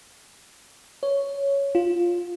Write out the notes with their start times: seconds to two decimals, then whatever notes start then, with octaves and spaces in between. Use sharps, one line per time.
1.03 C#5
1.75 F4